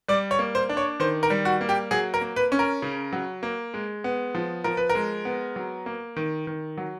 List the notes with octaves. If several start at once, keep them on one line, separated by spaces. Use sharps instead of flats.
G3 D5
C#5
A#3
C5
D4
C#5
D#3 C5
A#4
G3
F#4
A#3
G4
F#3 G#4
A#4
A#3
B4
C#4
A#4
C#3
F#3
A#3
G#3
B3
F3
F3 A#4
B4
A#4
G#3
B3
F#3
A#3
D#3
D#3
F#3